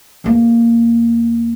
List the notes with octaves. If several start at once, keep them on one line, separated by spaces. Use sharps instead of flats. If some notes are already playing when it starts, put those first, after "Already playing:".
E2 A#3